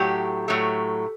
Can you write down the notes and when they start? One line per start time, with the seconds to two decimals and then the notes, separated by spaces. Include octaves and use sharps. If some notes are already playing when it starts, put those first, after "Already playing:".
Already playing: A2 F#3 A3 G4
0.48 A2 F#3 A3